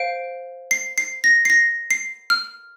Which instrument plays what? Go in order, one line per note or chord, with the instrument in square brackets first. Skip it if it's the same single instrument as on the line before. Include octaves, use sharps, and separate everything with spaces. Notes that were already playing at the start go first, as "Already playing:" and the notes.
Already playing: [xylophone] C5 F5 D7
C7
C7
A#6
C7
A#6
C7
F6